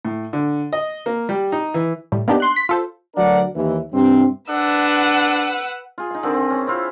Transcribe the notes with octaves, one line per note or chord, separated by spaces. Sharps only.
A2
D3
D#5
A#3
G3
D#4
E3
A2 G3
A#3 B3 D4 D#4 G4
C6 F#6
B6
F4 A4 C5
D2 F#3 D4 A#4 D5 F#5
D#2 E3
G2 C3 C4
D4 B4 F#5 E6
F4 G#4
D#4 F5
D3 D#3 C4
C4
C#4
C4 E4 F4